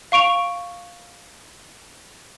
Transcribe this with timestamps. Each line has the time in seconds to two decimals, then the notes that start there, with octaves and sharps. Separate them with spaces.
0.12 F5 C#6 D7 F7